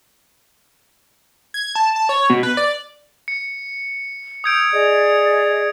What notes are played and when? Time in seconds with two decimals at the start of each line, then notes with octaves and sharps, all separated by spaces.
1.54 G#6
1.75 A5
1.96 A5
2.09 C#5
2.30 B2
2.43 B4
2.57 D5
3.28 C#7
4.44 D#6 E6 G6 G#6 D7
4.72 G#4 D5 D#5